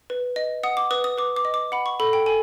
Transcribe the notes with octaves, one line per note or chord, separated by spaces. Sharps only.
B4
D#5
F#5 D#6
D6
B4 D#6
D#6
B4 D6
D6
D#5
D6
F#5 B5
C#6
A4 B5
G5
A4 G#5